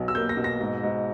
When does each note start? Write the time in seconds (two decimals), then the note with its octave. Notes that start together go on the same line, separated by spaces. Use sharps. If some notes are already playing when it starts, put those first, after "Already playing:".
Already playing: B1 B2
0.08 E6
0.15 A#3 G6
0.29 A#6
0.37 B2
0.44 A#6
0.61 G#2
0.83 G#2